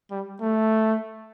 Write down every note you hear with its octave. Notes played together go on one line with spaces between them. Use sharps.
G3
A3